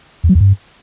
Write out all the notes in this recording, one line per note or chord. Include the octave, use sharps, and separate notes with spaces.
E2
F#3
E2
G2